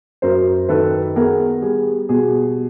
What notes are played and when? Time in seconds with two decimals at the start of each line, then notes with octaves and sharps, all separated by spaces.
0.22 F#2 A#4 C5
0.69 D#3 A4 B4
1.16 B3 G#4 A#4
1.62 G3 G#4
2.09 B2 G#4